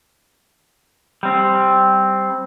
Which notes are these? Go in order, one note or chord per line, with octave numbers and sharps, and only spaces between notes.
G3 C4